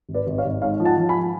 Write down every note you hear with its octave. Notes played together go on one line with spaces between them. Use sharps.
G#1
B4 D5
G#1
C#5 F5
G#1
G#2 C#5 F5
F3
F#5 A5
F3
G#5 B5